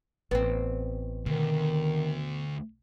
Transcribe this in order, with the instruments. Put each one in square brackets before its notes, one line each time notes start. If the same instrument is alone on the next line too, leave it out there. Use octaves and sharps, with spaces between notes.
[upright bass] A1 [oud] B3 C4
[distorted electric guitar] D2 [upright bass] B2 [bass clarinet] D#3